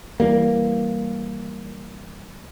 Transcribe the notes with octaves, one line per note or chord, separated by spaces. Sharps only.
E3 G3 A#3